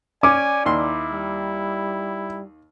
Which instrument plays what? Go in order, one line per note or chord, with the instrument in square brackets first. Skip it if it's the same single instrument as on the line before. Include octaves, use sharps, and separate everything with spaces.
[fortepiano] C#4 [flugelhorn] D5 [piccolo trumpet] G#5 [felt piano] D6
[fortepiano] D#2 C6 [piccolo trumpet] E4
[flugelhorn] G3